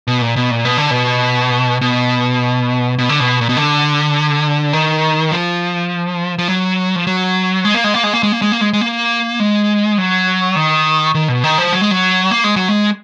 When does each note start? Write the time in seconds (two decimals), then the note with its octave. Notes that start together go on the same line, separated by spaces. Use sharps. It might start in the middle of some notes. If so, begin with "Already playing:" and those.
0.07 B2
0.21 A#2
0.36 B2
0.51 A#2
0.65 B2
0.77 D3
0.91 B2
1.81 B2
2.98 B2
3.09 D3
3.20 B2
3.41 A#2
3.49 B2
3.57 D3
4.73 D#3
5.31 F3
6.39 F3
6.48 F#3
6.96 F3
7.07 F#3
7.65 G#3
7.74 A#3
7.84 G#3
7.94 A#3
8.03 G#3
8.13 A#3
8.23 G#3
8.32 A#3
8.42 G#3
8.52 A#3
8.61 G#3
8.73 G#3
8.81 A#3
9.40 G#3
9.98 F#3
10.56 D#3
11.15 D#3
11.28 B2
11.44 D#3
11.58 F3
11.72 F#3
11.81 G#3
11.91 F#3
12.31 A#3
12.44 G#3
12.56 F#3
12.69 G#3